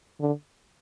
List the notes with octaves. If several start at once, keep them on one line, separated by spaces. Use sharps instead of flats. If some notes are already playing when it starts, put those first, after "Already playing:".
D3